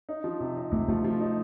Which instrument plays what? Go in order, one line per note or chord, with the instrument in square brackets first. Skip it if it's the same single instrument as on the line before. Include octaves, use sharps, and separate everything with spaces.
[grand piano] D#4
F3
C3
D#4
[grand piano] C3 [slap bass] A3
[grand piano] F3 [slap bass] A3
[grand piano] F3
D#4